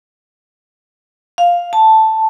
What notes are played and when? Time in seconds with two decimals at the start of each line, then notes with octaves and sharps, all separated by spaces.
1.38 F5
1.73 A5